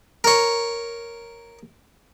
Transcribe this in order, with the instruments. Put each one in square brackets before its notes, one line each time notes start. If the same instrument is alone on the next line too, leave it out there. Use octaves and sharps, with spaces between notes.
[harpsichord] A#4 C#5